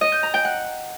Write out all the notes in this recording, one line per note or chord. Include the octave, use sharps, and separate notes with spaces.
D#5
G6
A#5
G5
F#5